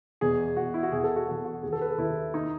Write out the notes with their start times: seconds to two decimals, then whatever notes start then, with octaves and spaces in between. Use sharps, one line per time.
0.21 E2 B2 G#4
0.57 E2 B2 F#4
0.74 E4
0.83 F#4
0.92 E2 B2 G#4
1.04 A4
1.16 F#4
1.28 E2 B2 F#4
1.45 F#4
1.63 D#2 D#3 G#4
1.73 A4
1.81 B4
1.90 A4
1.98 D#2 D#3 E4
2.34 D#3 D#4